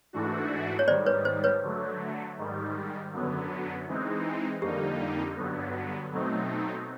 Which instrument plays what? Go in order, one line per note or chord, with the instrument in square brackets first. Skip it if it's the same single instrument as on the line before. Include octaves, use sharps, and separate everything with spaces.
[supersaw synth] G#2 E3 A3 D4 F#4
[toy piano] C#5
[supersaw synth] G#2 D#3 G3 [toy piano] C5 D5
[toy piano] B4 C#5
C5
B4 C#5
[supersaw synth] D3 F#3 A3
G#2 D#3 G3
F#2 D3 F#3 B3
E3 G#3 C4 D#4
[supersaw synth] F2 D3 G3 A#3 D#4 [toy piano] G4
[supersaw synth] G2 D3 F#3 B3
B2 F#3 A3 C4 D#4